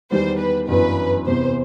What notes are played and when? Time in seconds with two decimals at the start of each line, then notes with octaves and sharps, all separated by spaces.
0.11 E2 D#3 G3 B3 C5
0.39 B4
0.68 G1 F#2 E3 B4
1.26 E2 C3 E3 B3 C5